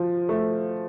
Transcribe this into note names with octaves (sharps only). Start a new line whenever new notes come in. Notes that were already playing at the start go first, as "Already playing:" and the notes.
Already playing: F3
A3